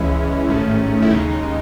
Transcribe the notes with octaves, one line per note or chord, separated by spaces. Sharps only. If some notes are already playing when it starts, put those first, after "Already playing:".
Already playing: C#2 C#3 E3 G#3 C#4 E4
A1 G#2 D#3 A3 C#4
E4
D#2 C#3 G#3 D#4